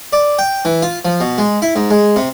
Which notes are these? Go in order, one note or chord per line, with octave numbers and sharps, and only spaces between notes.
D5
G5
E3
F4
F3
B2
G#3
E4
G#2
G#3
C3